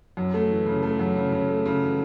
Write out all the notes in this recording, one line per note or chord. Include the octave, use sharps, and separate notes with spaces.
F#2
A3
E3
C#3
A3
F#2
C#3
C#3
A3
C#3
E3